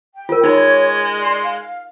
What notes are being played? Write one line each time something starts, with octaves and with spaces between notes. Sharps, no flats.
G5
F4 A#4
G#3 D#4 C#5 B5 G#6
D5 C6
F5